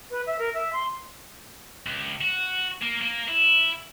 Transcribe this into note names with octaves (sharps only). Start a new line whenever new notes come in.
B4
E5
A#4
E5
C6
C#2
F#4
A#3
A#3
E4